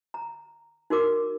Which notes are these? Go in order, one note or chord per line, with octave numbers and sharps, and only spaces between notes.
A#5
D#4 F#4 A#4 D6